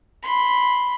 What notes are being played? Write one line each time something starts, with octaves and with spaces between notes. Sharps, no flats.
B5 C6